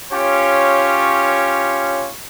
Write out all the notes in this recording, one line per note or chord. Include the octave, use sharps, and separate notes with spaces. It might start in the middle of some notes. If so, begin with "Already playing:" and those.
C#4 F4 G4 C#5